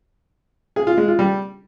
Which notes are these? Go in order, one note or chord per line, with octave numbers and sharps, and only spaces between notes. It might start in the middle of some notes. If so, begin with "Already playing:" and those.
G#4
F4
G#3
F4
G3